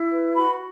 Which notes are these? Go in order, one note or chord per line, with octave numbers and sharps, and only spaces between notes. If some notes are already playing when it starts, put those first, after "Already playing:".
Already playing: E4
B4
F#4 B5